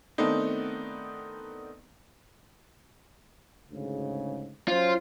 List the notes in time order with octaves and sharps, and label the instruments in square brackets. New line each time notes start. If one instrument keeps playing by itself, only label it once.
[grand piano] D#3 A3 B3 C4 D4 D#4
[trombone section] D2 G#2 C#3
[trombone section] F#3 C#4 C5 [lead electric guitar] F4